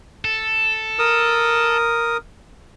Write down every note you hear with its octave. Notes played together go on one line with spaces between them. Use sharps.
A4
A#4 D#6